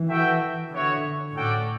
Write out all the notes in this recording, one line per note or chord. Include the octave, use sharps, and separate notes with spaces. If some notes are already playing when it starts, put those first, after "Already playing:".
Already playing: E3
F#4 A4 E5 G5
D3 B3 F#4 C#5 E5
A2 C#4 F#4 A4 D5 G5